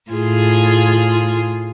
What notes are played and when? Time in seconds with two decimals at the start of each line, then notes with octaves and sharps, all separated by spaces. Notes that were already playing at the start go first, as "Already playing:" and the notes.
0.11 A2 F4 G#4